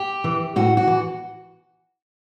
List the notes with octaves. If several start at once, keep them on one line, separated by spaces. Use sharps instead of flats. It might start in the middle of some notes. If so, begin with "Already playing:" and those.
Already playing: G4
E3
A2 F#4
F#4
E3